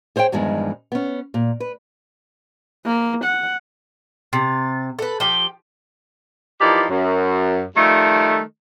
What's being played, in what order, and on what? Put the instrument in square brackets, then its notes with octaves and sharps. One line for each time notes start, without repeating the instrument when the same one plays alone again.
[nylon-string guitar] G#4 C5 C#5 F5 G5
E2 G2 D#3 F3 G#3
B3 C#4
A#2
B4
[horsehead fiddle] A#3
F#5
[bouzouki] C3 [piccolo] A6
[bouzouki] A4 B4
[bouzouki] F3 G4 [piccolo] G7
[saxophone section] E3 F3 D#4 G4 A#4 D5
F#2
D#3 F3 G3 A3